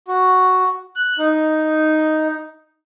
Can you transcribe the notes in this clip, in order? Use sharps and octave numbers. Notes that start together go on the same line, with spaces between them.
F#4
F#6
D#4